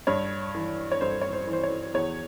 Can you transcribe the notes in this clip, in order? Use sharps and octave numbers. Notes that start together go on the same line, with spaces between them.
G2 C#5
E3
C#5
G2 C5
C#5
C5
E3
C5
C#5
E2 C#5